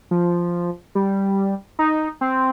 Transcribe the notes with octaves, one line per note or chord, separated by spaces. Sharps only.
F3
G3
D#4
C4